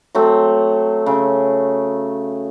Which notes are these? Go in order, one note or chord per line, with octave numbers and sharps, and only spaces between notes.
F#3 A3 C4
C#3